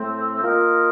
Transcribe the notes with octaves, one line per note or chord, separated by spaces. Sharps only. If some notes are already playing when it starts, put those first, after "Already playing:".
Already playing: A2 A3 C4
A#3 F4 A#4 D#5